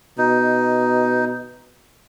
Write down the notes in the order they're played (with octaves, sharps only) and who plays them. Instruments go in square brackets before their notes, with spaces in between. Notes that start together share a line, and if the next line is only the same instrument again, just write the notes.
[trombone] B2 [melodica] D#4